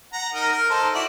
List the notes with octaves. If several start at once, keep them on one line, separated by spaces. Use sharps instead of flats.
F#5 A#5
D#4 A#4 D#5
A#4
D#4 A4 C5
E4 F#4 D5